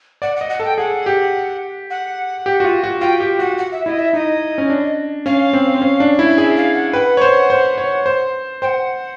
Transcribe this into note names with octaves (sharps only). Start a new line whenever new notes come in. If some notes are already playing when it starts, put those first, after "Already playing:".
D5 F#5
F#5
D#5
F#5
A4 G5
G#4 F#5
G4
F#5
G4
F#4
F4
F#4
F4 G5
G4
F#4 F#5
F#5
E5
E4 D#5
E5
D#4 D#5
C#4
D4
C#4 F5
C4
C4
C#4
D4
E4
G#4 E5
F5
F#5
B4 F#5 G5
C#5
C5
C5
C#5
C5
C5 F#5 G5